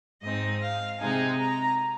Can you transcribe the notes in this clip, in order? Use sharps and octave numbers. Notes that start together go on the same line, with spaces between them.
G#2 G#3 C4 D#4 D#5
F5
C3 G#3 D#4 G#5
A#5